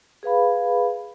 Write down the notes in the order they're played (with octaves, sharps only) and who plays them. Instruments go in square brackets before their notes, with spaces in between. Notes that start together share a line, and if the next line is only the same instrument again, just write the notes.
[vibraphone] G#4 B4 F5 B5